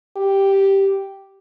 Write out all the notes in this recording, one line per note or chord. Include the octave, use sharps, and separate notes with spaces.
G4